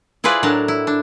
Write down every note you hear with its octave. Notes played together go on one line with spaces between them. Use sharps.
E4 F4 G#4 B4 C5 D5
A2 F#3 D4 A#4 A5
E4
D4